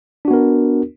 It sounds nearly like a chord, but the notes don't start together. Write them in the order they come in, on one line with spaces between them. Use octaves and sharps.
D4 F#4 B3 A#4